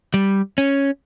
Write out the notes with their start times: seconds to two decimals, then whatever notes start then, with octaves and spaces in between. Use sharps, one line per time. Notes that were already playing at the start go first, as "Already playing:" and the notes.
0.14 G3
0.58 C#4